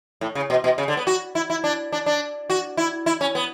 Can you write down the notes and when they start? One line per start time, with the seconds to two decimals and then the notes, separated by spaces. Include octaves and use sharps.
0.21 A2
0.35 C#3
0.50 B2
0.64 B2
0.78 C#3
0.88 D3
0.97 B3
1.07 F#4
1.35 E4
1.50 E4
1.64 D4
1.92 D4
2.06 D4
2.50 F#4
2.77 E4
3.06 E4
3.21 C#4
3.35 B3